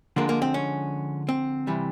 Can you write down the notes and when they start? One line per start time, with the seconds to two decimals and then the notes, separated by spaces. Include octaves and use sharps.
0.16 D3 F3 G#3 A#3
0.29 A#3
0.42 C4
0.54 C#4
1.29 C4
1.67 C3 E3 G3